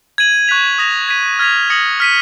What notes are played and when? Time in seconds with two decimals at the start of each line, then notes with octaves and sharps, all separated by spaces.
0.18 G#6 D#7 F#7
0.48 C#6 F#6 B6 F7
0.78 D#6 A#6 F7
1.08 G#6 B6 D#7
1.39 F6 G#6 B6 F7
1.70 D#6 A#6 C#7 F#7
2.00 F6 B6 D#7